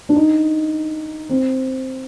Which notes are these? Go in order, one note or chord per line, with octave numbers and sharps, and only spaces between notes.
D4
D#4
C4